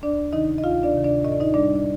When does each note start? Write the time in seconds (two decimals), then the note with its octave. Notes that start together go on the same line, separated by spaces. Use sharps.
0.03 D2 D4 D5
0.32 C3 D#3 D#4 D#5
0.58 D#5
0.63 D2 F4 F5
0.83 D4 D5
0.94 C3 D#3
1.04 D4 D5
1.24 A2 D#5
1.32 D5
1.40 D#4 D#5
1.54 G3 D4 D5
1.75 D5